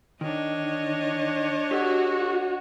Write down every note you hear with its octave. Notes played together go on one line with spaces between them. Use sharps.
D#3 D4 C#5 D#5
F#4 G4 A4